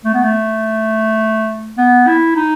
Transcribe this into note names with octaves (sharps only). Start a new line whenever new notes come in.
A3
B3
A3
B3
E4
D#4